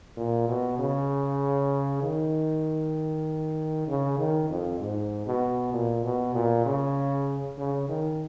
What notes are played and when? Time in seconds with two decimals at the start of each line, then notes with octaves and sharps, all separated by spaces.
0.17 A#2
0.48 B2
0.79 C#3
2.02 D#3
3.88 C#3
4.19 D#3
4.50 F2
4.80 G#2
5.27 B2
5.73 A#2
6.04 B2
6.35 A#2
6.66 C#3
7.58 C#3
7.89 D#3